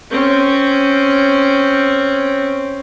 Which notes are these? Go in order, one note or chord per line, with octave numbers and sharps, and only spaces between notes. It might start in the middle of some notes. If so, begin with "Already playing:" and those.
C4 C#4